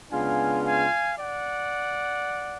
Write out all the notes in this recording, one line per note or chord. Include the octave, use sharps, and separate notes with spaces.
C#3 G#3 B3 D4 F4 F5 G#5
F5 G#5
D5 F#5